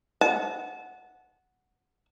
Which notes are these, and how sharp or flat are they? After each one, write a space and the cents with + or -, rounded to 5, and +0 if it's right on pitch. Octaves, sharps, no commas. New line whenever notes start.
F#5 -5 A5 -30